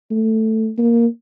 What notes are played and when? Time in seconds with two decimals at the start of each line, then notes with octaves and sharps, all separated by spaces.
0.11 A3
0.78 A#3